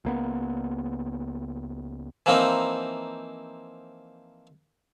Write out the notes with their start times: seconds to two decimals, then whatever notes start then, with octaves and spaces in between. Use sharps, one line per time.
0.05 C#2 A#3 B3
2.26 E3 F3 A#3 C4 D#4